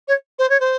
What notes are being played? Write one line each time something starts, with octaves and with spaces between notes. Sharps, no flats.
C#5
C5
C#5
C5